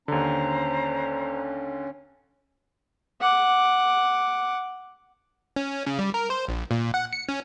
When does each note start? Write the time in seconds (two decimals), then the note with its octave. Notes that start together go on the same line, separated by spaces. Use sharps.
0.08 D#2 D3 C#4 C5 A#5
3.20 F#5 D6
5.56 C#4
5.86 C#3
5.99 G3
6.14 A#4
6.30 C5
6.48 A#1
6.71 A#2
6.94 F#5
7.13 C#7
7.29 C#4